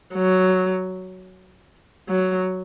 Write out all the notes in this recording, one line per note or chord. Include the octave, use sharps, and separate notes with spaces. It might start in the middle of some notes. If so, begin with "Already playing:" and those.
F#3
F#3